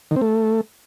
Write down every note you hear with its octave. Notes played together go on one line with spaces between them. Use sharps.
D#3
C4
A3